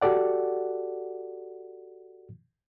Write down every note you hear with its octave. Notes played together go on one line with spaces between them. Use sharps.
F#4 G4 A4 D5 F#5